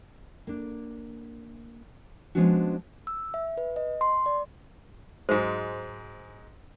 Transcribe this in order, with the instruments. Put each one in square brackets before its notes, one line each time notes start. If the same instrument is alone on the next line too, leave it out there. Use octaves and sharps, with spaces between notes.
[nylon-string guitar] A#3 D4
F3 G#3 B3 C#4 D4 F#4
[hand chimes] E6
E5
B4
D#5
C6
D5
[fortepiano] G#2 F#3 G#3 [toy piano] C5